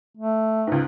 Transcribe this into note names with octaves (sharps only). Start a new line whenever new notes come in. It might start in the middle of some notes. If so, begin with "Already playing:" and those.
A3
C#2 G#2